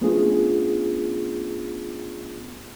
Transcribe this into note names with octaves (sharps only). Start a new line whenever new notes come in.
A3 B3 C#4 D4 F4 G#4